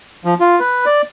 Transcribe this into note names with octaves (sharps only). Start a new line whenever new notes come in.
F3
F4
B4
D5